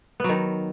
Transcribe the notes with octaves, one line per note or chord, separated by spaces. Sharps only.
D#3 F#3 B3